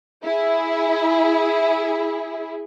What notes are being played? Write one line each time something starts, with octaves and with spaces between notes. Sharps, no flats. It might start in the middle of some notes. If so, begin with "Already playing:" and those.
E4 G#4